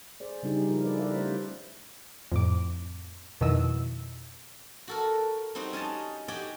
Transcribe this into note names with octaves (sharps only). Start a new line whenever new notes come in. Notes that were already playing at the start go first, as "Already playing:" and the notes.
G#4 C5 D5
C#3 G3 D4 D#4 G4 G#4
F3 E4 F4 A#4
G3 D4 A4 B4 D5 D#5
G4 A#4 B4 D5 E5 F5
G3 A3 C#4 E4 F4 C5
F2 A2 D6
F2 B2 D#3 E4 D#5 E6
F#4 A4 A#4
G3 C4 D#4 F#4
C#4 D#4 D#5 A5
F#4 G4 D5 D#5 G5 G#5